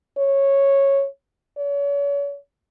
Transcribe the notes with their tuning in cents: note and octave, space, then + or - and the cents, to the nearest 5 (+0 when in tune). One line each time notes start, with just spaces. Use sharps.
C#5 -10
C#5 +35